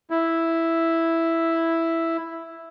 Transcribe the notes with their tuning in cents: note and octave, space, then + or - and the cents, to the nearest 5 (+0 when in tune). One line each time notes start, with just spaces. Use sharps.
E4 +0